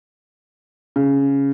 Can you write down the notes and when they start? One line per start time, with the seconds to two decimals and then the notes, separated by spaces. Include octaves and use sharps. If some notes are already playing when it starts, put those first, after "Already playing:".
0.96 C#3